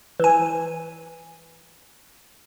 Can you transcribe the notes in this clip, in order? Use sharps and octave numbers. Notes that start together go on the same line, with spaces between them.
E3 G#5